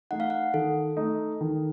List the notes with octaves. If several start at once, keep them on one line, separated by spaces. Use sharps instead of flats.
A3 D#4 F#5
F5
F#5
D#3 A4
A3 D#4
D#3